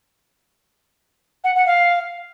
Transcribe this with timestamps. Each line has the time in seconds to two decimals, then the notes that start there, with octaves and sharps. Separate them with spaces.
1.44 F#5
1.55 F#5
1.66 F5